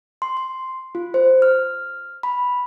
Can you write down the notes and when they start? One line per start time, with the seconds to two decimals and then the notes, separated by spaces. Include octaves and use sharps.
0.22 C6
0.37 C6
0.95 F4
1.14 C5
1.42 F6
2.23 B5